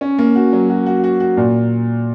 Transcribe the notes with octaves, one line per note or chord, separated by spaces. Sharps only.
C#4
A#3
F#4
F#3
F#4
F#4
F#4
F#4
A#2